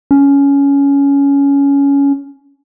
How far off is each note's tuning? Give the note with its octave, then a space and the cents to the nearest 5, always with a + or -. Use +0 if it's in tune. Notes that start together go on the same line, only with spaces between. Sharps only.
C#4 +15